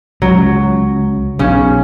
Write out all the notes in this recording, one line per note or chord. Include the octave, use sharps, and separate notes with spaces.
C#2 F#3
B1 C#3 C#4